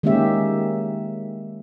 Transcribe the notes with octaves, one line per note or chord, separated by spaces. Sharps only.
D#3 G#3 A#3 C#4 G4 E5